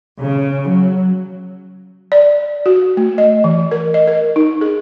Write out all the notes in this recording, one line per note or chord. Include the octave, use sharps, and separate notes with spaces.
C#3
F#3
D5
F#4
A3
D#5
E3
A#4
D#5
A#4
D#4
G#4